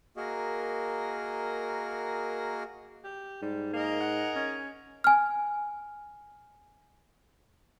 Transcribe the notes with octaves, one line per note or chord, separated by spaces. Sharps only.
A#3 F#4 G#4 A#4 D#5
G4
G#2 G3
A#3 G#4 A#4 D#5
F#5
C#4
G#5 F6